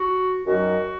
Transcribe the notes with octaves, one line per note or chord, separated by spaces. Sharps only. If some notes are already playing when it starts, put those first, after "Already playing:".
Already playing: F#4
F#2 D#3 F#3 F#4